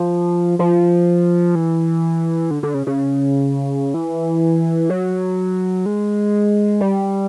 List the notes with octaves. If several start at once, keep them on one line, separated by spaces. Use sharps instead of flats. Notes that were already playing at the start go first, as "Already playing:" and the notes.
Already playing: F3
F3
E3
D3
D3
C#3
C#3
E3
F#3
G#3
G3